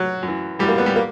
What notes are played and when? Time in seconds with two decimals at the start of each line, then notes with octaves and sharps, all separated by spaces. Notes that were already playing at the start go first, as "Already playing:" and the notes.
Already playing: F#3
0.23 F#2
0.28 E3
0.59 F#2 E3 G3
0.68 A#3
0.78 B3
0.86 G3
0.96 A#3